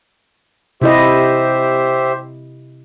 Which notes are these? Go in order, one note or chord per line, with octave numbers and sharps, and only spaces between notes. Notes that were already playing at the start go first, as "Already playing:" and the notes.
C3 E4 G4 C5 D#5 E5